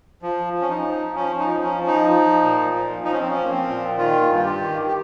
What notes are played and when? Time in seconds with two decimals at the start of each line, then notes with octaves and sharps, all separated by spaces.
0.22 F3
0.53 F3
0.61 C#4
0.69 D#4
0.84 F3
1.16 F3 C#4
1.39 D#4
1.48 F3
1.63 C#4
1.78 F3
1.87 D#4
2.10 F3
2.42 A#2
2.73 F3
3.04 F3 D#4
3.12 C#4
3.20 C4
3.28 C#4
3.35 F3
3.43 A#3
3.51 C4
3.67 A#2
3.98 D#3 F4
4.29 G2
4.37 F4
4.44 G4
4.60 D#3
4.87 G4